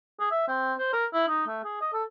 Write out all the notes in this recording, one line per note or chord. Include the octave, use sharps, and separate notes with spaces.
G#4
E5
C4
C5
A#4
E4
D#4
A3
G#4
D#5
A4